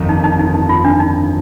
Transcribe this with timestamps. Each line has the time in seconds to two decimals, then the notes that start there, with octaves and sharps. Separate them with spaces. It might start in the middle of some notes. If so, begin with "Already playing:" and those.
Already playing: G1 F2 D#3
0.09 D#4
0.24 D#4
0.39 D#4
0.54 D#4
0.69 F4
0.85 D4
1.00 D#4